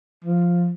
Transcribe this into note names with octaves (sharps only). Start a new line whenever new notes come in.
F3